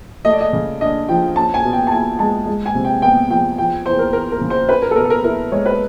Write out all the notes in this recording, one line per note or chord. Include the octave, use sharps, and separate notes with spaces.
A3 D#5
D5
D#5
C#3
D4 D#5
F3 G5
C#4 A5
G#5
B2
G5
A5
E4 G#5
G#3 A5
G#3
G#5
C3
G5
B3 G5
F3 G5
F3 G5
E2 C5
A#4
E2 A#4
A#4
C#3
C5
C#4 B4
A#4
A4
B2 A#4
A4
A#4
E4 A#4
G#3 C#5
B4